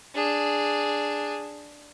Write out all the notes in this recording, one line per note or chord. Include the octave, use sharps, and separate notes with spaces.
D4 G#4